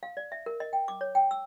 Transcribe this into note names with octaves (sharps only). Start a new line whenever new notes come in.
F5
D5
E5
A#4
D#5
G5
D6
C#5
G5
E6